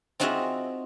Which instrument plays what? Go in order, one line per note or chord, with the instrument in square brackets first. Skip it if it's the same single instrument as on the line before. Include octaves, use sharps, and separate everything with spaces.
[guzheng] C4 D#4 F4 F#4 G#4 E5